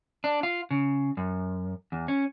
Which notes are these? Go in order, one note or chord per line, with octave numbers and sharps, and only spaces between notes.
D4
F4
C#3
F#2
E2
C#4